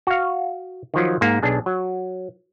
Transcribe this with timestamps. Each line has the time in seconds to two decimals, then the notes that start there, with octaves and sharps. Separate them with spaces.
0.07 F#4 F5
0.94 D#3 F3 F#3
1.21 G#2 A#3
1.42 B1 D4 G#4
1.66 F#3